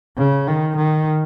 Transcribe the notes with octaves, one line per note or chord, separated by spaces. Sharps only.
C#3
D#3
D#3